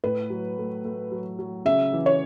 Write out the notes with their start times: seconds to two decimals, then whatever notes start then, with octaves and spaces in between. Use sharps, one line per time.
0.04 A2 B4
0.30 F#3
0.58 A3
0.84 A3
1.12 F#3
1.39 F#3
1.65 C#3 E5
1.93 E3
2.06 C#5